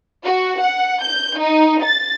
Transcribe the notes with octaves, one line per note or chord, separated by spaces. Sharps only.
F#4
F#5
G6
D#4
A6